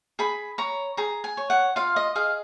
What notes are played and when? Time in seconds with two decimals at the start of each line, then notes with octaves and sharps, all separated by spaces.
0.19 G#4 B5
0.58 C#5 A#5
0.97 G#4 A#5
1.24 G#5
1.37 C#5
1.50 F#5
1.76 F4 F5
1.96 D#5
2.15 G#4 D#5 F5